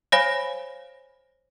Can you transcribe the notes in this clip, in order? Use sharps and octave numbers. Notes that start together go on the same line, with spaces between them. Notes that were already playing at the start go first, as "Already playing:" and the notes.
C5 C#5 F5 G#5 B5 A#6